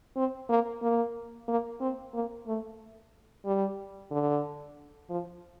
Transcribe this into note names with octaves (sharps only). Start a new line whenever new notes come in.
C4
A#3
A#3
A#3
C4
A#3
A3
G3
D3
F3